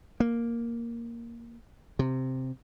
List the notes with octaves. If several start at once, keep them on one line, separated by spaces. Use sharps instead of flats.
A#3
C3